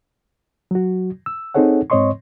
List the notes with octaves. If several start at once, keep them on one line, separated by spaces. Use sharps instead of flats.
F#3 F#4
E6
C4 D#4 G#4 A4 C#5 F#5
G#2 C4 C#5 D#5 C6 C#6